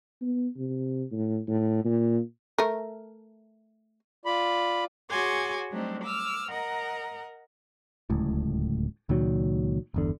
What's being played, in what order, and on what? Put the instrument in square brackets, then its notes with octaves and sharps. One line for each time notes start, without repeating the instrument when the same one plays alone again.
[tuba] B3
C3
A2
A2
A#2
[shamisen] A3 A#4
[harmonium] F4 D5 [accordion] B5
[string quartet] F#4 G#4 C#5 G#5 C6 D6
F#3 G3 A3 C4 D4 D#4
D6 E6 F6
A#4 D#5 F#5 A#5
[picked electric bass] D1 C#2 A2
C#2 A#2 D#3 F#3
G1 E2 D3